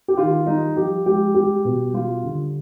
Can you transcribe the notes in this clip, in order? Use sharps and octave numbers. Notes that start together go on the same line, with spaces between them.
G4
D#3 F4
G3 D#4
F3 G4
G#3 G4
G3 G4
B2
G3 F4
D3